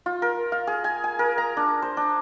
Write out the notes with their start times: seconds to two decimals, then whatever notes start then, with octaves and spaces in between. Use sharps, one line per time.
0.06 F4
0.22 A#4
0.52 F5
0.67 G#4
0.84 G#5
1.04 G#5
1.19 A#4
1.38 A#5
1.57 D4
1.82 C5
1.97 D4